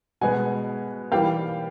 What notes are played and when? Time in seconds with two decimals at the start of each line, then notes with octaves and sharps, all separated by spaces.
0.21 B2 G#3 B3 F#5 G#5
1.11 E3 G3 A#3 F5 G5